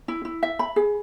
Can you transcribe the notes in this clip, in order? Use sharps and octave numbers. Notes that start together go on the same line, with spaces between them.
E4
E4
E5
B5
G#4